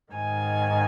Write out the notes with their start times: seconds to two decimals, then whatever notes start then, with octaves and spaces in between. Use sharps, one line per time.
0.12 G#2 D#3 G#5